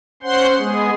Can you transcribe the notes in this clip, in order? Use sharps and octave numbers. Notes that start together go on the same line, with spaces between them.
C#4 C5 F#5 C6
G#3 B3 G#4